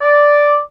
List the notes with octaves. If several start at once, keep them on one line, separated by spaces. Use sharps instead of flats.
D5